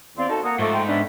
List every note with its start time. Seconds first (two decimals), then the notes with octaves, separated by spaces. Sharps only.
0.17 E2 C4 D5 F5 C6
0.29 D#4 F#4 A4 A5
0.43 A#3 F#5 A#5 D#6
0.59 G#2 F3 A3 C#6 D6
0.72 G5 C6
0.88 B3 C#4 D4 E5 B5